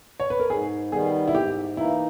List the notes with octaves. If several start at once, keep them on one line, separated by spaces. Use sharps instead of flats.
C#5
B4
A#4
G#2 G#4
D#3 G3 B3 G#4
E4
G#2 G4
E3 A#3 D#4 E4